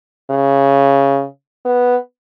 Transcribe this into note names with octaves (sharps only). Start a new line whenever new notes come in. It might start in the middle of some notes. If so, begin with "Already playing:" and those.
C#3
B3